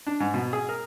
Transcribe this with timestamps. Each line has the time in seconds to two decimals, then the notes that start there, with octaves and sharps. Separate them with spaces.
0.07 D4
0.20 G#2
0.34 B2
0.53 G#4
0.69 A#4